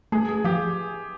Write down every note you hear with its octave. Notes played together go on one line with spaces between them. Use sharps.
A3 G#4
G#4
F3 G4